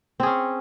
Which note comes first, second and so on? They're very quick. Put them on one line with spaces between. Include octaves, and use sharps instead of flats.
C4 G#4 C#4